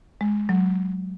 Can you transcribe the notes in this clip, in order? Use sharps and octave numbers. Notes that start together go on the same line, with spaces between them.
G#3
F#3